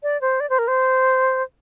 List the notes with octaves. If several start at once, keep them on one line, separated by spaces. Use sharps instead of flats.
D5
C5
D5
C5
A#4
C5